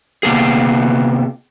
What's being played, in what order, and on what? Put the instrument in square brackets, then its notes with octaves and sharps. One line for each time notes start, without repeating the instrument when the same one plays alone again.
[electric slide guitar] C3 A#3 B3 G#4